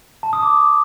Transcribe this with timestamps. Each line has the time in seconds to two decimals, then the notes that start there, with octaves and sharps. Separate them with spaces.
0.23 A5
0.33 D#6
0.43 D6